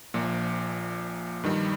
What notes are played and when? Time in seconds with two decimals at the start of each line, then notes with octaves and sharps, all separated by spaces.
0.14 A#1 A#2 F3
1.43 G2 D#3 G3